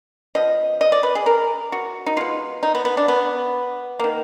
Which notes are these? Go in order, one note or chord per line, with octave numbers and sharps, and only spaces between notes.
F3 B3 D#5
D#5
D5
B4
G#4
A#4
F#4
D#4
B2 G#3 B3 F4
D#4
B3
B3
D4
B3
D#3 A#3